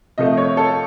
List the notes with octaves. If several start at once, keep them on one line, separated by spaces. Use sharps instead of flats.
C3 F3 A3 D#5
C#5
A4